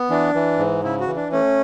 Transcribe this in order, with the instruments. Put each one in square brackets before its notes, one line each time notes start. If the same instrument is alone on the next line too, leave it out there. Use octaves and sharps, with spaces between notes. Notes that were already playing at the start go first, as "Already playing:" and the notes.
Already playing: [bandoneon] B3
[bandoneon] E3 [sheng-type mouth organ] D4
[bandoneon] E3
G#2
[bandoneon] C#3 [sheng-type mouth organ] E4
[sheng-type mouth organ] F#4
[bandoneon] E3
[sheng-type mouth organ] D4
[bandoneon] A3 [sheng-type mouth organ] C#4